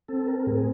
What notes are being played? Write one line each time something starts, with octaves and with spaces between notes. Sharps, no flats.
C4 A4
A#4
A2 G#4